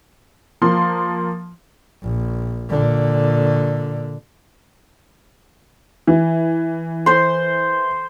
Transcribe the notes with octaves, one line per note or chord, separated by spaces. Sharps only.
F3 A#3 C6
A#1
A#2 D3
E3
C5 C6